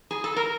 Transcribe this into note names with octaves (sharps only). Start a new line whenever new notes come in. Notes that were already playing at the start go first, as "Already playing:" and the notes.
G#4
A4
A#4